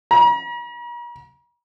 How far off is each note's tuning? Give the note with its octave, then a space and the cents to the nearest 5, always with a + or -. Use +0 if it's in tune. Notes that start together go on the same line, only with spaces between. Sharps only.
A#5 +45